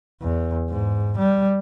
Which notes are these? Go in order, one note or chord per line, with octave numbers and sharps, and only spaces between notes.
E2
G#2
G3